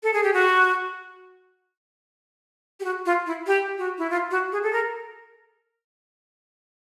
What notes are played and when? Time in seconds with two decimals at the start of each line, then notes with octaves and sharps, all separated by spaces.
0.03 A4
0.13 G#4
0.23 G4
0.34 F#4
2.80 G4
2.84 F#4
3.06 F4
3.26 E4
3.47 G4
3.78 F#4
3.98 E4
4.10 F4
4.31 F#4
4.52 G#4
4.63 A4
4.73 A#4